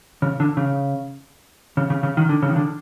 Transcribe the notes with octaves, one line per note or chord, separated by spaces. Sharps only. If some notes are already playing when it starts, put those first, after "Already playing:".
C#3
D3
C#3
C#3
C#3
C#3
D#3
D3
C#3
D#3
D3